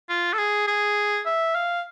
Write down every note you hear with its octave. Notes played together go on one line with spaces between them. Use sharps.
F4
A4
G#4
G#4
E5
F5